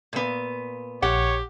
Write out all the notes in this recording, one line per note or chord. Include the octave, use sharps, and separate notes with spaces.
A#2 B3
A#1 G4 C#5 F#5